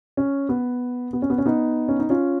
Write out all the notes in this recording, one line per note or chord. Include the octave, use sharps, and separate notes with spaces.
C#4
B3
B3
C#4
B3
C#4
B3 D#4
C#4
D#4
C#4 F4